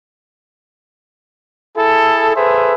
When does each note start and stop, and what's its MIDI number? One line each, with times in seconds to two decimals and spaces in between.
1.77 2.31 64
1.77 2.31 68
1.77 2.31 69
2.35 2.74 68
2.35 2.74 69
2.35 2.74 71
2.35 2.74 72
2.35 2.74 76